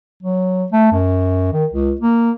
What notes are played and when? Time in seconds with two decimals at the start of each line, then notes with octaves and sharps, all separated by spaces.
0.22 F#3
0.72 A3
0.92 F#2
1.53 D#3
1.73 C#2
2.00 A#3